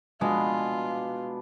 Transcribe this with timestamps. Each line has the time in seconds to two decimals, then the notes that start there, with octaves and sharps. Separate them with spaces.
0.21 B2 G#3 B3 D4 F4